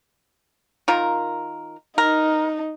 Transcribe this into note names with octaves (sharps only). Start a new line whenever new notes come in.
D#3 F4 A#4
D#4 A#4